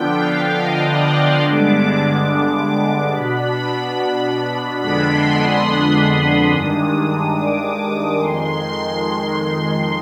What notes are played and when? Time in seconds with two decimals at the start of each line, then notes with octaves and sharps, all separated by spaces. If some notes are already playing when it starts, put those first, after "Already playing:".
Already playing: D3 F3 B3 D4 G5
0.16 F5
0.58 D#5
0.87 D5
1.15 C6
1.43 G2 D3 G#3 B3 D4 D6
2.28 D6
3.12 B2 B3 D4 B5
4.81 F2 D3 G#3 B3 D4 B5
5.10 C6
5.38 D#6
6.50 G2 D#3 G#3 D4
7.35 D6
8.20 F2 D#3 G#3 C6